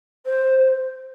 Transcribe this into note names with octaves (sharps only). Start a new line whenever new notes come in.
C5